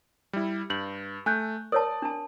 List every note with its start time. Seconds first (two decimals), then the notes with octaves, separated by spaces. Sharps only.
0.33 G3 E4
0.70 G2 G6 F#7
1.26 A3 G#5 F#6 G6
1.72 A#4 C#5 D5 A5 D#6
2.02 D4 A5